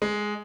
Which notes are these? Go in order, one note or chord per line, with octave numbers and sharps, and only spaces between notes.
G#3